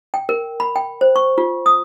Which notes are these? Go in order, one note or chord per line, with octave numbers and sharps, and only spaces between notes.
G5
A#4
B5
G5
C5
C#6
F4
D#6